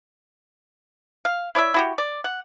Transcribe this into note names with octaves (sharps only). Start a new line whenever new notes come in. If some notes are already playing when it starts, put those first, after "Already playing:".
F5
E4 C#5 D5 E5
E4 F#4 G4
D5
F#5